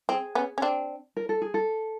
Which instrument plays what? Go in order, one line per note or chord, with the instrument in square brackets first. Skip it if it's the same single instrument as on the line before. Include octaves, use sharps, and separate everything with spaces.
[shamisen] C4 [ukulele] G#4
[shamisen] B3 C#4
C#4
C4 D4
[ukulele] A#4
A4
G#4
A4